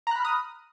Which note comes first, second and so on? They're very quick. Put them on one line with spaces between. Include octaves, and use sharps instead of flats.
A#5 F#6 B5 F6 D#6